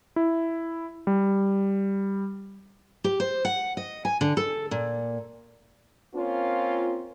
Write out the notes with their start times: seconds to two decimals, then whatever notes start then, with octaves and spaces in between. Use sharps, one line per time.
0.16 E4
1.07 G3
3.04 G4
3.20 C5
3.45 F#5
3.77 D#5
4.05 G#5
4.21 D3
4.37 A4
4.71 A#2
6.14 A#3 C4 C#4 F4